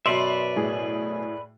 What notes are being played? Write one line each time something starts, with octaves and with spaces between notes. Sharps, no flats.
F#2 B2 B4 D5 E5 C6 C7
A2 G#4